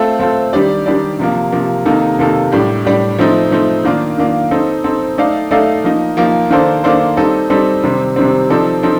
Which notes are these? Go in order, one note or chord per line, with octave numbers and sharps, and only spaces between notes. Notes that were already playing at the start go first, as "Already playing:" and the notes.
Already playing: A3 C4 F4 A4
A3 C4 F4 A4
D#3 G3 D4 G4 D5
D#3 G3 D4 G4 D5
C3 F3 A#3
C3 F3 A#3
C3 D#3 A#3 D#4 A4
C3 D#3 A#3 D#4 A4
A2 G3 D4 G4
A2 G3 D4 G4
F3 A3 C4 D#4
F3 A3 C4 D#4
D#3 A#3 D4 F4
D#3 A#3 D4 F4
C4 D#4 A4
C4 D#4 A4
A3 D#4 A4 D5 F5
A3 D#4 A4 D5 F5
F3 A#3 D#4
F3 A#3 D#4
D#3 A#3 D4 A4 C5
D#3 A#3 D4 A4 C5
G3 C4 D#4 A4
G3 C4 D#4 A4
C3 D#3 G3 C4
C3 D#3 G3 C4
F3 C4 D#4 A4 D5
F3 C4 D#4 A4